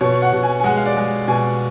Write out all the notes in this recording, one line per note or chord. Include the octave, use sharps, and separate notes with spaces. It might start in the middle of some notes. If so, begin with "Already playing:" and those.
B2 C#5
F#5
B2
G#5
G#5
G#3 F#5
F5
D5
G#3
B2 G#5